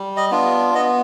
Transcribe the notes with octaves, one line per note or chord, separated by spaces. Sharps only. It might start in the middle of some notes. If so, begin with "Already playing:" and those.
Already playing: G3
D#5
B3 D4 F4
B3 D#5